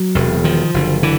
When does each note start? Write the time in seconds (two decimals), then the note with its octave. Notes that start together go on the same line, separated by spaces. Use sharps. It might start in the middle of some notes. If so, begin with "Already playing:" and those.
Already playing: F#3
0.15 E1 E2 C3
0.44 D#3 F3
0.74 F#1 F#2 D3
1.03 D3 E3